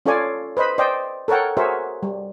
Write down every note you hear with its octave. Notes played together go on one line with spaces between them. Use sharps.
C#4 F4 A4 C#5 D5 G#5
B4 C5 D#5 B5
C5 D5 D#5 G5
A4 A#4 C#5 F#5 G5
F#4 G#4 A#4 C5 C#5 E5
G3